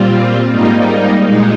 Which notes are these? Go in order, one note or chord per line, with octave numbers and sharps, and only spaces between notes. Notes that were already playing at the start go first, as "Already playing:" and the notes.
Already playing: A#2 G3 C4 F4
G#2 G3 A#3 D#4
A#2 G#3 D#4